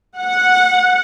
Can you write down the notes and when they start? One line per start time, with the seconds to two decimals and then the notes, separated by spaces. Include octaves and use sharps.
0.19 F#5